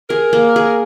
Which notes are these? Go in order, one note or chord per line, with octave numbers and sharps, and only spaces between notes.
G#4 A#4
A#3
G#4